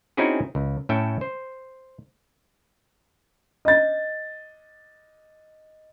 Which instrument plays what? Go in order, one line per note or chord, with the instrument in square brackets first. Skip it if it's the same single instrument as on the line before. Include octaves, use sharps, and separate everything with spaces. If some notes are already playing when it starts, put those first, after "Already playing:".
[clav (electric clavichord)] C4 C#4 D#4 E4 F#4 G#4
C#2
A2 C#4 E5 G5 A5
C5
[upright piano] D#5 A6